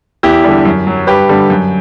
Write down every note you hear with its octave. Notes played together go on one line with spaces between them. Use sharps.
E2 E4 G4
D3 G3
F#2
F#3
G2 G4 B4
D3 G3
F#2